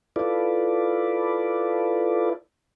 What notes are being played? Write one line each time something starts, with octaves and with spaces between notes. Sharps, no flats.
E4 F4 A4 B4 D5